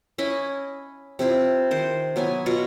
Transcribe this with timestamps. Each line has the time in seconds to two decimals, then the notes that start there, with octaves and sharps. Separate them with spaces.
0.18 C#4 E4 D#5 B5
1.19 C3 C4 E4 F4
1.71 D#3 C5
2.16 F#3 B3 E4 G#5
2.46 B2 F4 F#4